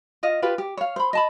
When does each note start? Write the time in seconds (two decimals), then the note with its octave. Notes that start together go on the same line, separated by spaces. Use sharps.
0.23 F4 D#5 F5
0.42 F4 G4 B4
0.58 G4
0.77 C#5 F5
0.96 C5 B5
1.13 D#5 A5 B5